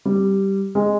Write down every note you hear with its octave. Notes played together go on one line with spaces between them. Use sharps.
G3
G#3